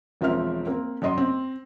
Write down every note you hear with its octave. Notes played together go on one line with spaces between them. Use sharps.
E1 F3 C4 A#4 E5 F6
A#3 C4
F#2 D5 D#5 C6
C4